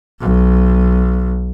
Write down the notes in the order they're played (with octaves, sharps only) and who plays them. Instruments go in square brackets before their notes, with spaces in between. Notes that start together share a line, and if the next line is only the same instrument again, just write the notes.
[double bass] B1